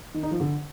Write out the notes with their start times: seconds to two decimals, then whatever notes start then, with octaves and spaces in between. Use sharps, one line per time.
0.14 D#3
0.23 D#4
0.31 F3
0.40 D3